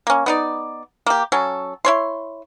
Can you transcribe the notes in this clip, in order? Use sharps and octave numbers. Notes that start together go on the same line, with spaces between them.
A#3 C#4
B3 D#4 D5
A#3 G4
F#3 C#4 A4
E4 C#5 C6